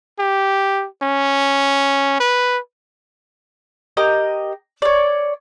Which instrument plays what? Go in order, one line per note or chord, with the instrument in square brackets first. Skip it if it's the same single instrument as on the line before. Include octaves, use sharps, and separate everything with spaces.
[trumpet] G4
C#4
B4
[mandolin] G4 A#4 D#5
C#5 D5